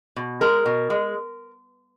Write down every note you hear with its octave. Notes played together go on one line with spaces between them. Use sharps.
B2
G#3 A#4
B2
G#3